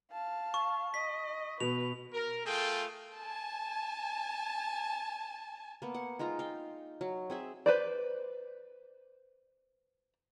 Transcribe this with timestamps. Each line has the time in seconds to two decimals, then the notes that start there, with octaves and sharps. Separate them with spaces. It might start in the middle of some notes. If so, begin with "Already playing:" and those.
0.12 F5 A5
0.54 C#6
0.94 D#5 B6
1.60 B2 B4 F7
2.13 A#4
2.45 A3 F4 G#4 A4 G5
3.15 G#5 A5
5.82 A#3 B3
5.94 F#5
6.19 G#3 D#4 F4 A#5
6.39 F5 G5
7.01 F#3
7.30 C4 G#4 E5
7.66 B4 C5 D5